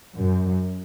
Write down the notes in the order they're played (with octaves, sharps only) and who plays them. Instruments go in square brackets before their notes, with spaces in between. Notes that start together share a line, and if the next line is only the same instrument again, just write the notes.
[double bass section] F#2